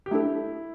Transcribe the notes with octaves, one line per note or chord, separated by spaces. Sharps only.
G4
A3 D4 E4 A4